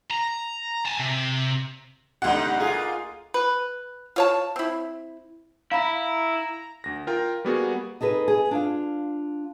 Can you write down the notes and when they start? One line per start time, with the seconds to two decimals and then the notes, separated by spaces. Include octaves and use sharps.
0.10 A#5
0.85 G#5 A5
0.99 C3
2.22 D2 B2 G3 D#4 F#5
2.60 A#3 F4 G#4
3.34 B4
4.16 F4 C#5 A5
4.56 C4 E4
5.72 E4 F5 A#5 B5
6.84 D2 A#6
7.07 F4 A#4 G5
7.45 G3 A#3 B3 F#4 G#4
8.01 D#4 G#4 A4 B4
8.28 G#4
8.51 D4 F4 F5